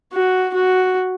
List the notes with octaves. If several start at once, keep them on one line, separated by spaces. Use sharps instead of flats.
F#4
F#4